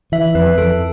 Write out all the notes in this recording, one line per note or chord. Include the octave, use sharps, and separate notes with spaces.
E3 E5
F2 B4
F2 A4